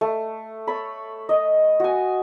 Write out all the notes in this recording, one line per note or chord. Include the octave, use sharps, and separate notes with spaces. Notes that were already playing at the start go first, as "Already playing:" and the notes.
A3
A4 C#5 B5
D#5
F#4 G#5